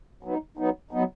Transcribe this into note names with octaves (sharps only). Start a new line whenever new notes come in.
F#3 B3 D#4
F#3 B3 D#4
F#3 B3 D#4